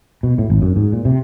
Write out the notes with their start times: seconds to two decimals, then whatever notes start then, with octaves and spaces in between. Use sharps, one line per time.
0.23 B2
0.38 A2
0.50 G#1
0.62 F#2
0.76 G#2
0.92 A#2
1.05 C3